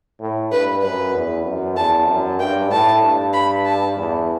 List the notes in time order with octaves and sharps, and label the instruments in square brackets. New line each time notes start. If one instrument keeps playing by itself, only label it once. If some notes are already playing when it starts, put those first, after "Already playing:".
[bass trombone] A2
[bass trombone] G2 [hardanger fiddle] B4
[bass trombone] F#2 [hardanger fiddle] B4
[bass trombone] E2
F#2
[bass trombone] E2 [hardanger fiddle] A5
[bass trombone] F#2
[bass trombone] G2 [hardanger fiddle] G5
[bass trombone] A2 [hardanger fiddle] A5
[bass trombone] G2
[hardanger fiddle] B5
A5
[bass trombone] E2